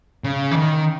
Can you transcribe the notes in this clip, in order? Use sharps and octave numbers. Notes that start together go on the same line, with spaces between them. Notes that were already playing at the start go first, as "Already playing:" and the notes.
C#3
E3
D#3